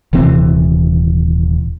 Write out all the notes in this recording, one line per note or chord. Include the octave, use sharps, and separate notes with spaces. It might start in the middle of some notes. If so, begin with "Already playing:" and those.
D#1 C3 E3 C4